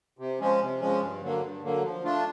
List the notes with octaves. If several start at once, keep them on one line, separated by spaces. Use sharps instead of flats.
C3
F3 G#3 C#4
C3
F3 G#3 C#4
G2
D3 F#3 A#3
G2
D3 F#3 A#3
F3
A3 D4 F4